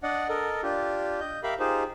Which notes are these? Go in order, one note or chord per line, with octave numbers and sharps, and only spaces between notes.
D4 D5 D#5 F#5
A4 A#4 D#5
D4 F4 G4
D#5 G6
G4 A#4 E5 F5 B5
D#4 F4 G4 G#4 C5